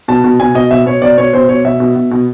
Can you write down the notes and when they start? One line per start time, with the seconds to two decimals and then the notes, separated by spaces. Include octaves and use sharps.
0.08 B2 A5
0.24 B2
0.39 B2 G#5
0.55 B2 D#5
0.71 B2 E5
0.86 B2 C#5
1.02 B2 D5
1.18 B2 C#5
1.33 B2 C5
1.49 B2 C#5
1.65 B2 E5
1.80 B2
1.96 B2
2.11 B2